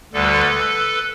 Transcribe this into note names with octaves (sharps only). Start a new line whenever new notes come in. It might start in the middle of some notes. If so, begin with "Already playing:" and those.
D2 D3 G3 A4 B4